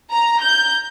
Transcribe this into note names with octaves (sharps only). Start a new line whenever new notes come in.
A#5
G6